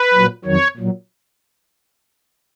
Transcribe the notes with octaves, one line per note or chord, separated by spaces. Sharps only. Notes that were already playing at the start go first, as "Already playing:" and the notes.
Already playing: B4
A#2 F#3
F2 D#3 F#3 C#5
A#2 F#3